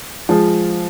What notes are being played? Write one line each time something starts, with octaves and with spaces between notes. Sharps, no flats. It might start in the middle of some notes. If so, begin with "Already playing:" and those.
F3 G#3